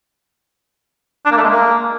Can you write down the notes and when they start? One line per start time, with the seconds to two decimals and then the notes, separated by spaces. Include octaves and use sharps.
1.26 D4
1.32 A#3
1.37 A3
1.43 G#3
1.49 A#3